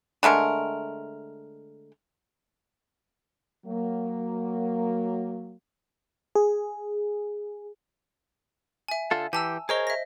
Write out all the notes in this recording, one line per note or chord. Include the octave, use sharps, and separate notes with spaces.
D3 G#3 A3 A#4
F#3 A#3
G#4
E5 G#5
D3 F4 A4
E3 G4 G#5 A5 E6
G#4 A#4 C5 C#5 D#5 G7
E5 A#6